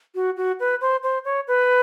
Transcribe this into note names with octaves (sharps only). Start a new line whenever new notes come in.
F#4
F#4
B4
C5
C5
C#5
B4